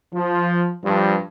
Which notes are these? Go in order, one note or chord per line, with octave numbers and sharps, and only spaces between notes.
F3
G2 F3